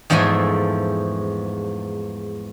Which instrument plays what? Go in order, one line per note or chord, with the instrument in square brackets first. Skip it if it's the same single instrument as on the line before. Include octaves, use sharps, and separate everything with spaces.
[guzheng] E2 G#2 F3 A3 E5 G#5